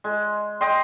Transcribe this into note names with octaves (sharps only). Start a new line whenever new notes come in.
G#3
D#5 G5 C6